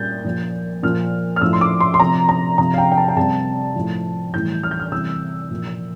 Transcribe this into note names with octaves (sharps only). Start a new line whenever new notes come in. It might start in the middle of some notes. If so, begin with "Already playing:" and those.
Already playing: A#2 G3 G6 A6
A#2 F3
A#2 F3 F6
F6
A2 F3 E6
C6
D6
C6
C6
C3 F3 A#5
A#5
C3 F3 A#5
F5
G5
G5
A5
G5
C3 G3 A5
A2 F3
A2 E3 G3 G6
F6
G6
F6
C3 E3 G3 E6
A#2 F3